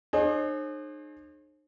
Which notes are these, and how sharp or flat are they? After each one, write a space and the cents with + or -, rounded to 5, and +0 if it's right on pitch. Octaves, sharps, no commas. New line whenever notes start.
D#4 -45 G#4 +30 C5 +45